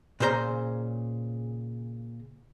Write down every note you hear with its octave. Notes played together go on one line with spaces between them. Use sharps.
A#2 C#3 C5 C#5 A#5